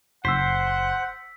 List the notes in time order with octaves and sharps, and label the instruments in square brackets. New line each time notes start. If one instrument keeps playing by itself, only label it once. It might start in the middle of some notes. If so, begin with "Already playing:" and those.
[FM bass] F#1 [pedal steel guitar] C5 [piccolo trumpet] F#5 [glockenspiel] E6 B6